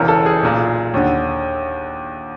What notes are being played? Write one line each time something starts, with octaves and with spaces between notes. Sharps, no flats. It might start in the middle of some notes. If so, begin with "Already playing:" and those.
Already playing: E1 E2 C#3 E3 A#4
A4
G#4
B1 A#2
D#2 D3